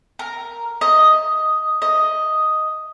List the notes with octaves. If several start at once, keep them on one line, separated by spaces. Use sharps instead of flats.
A#4
D#5
D#5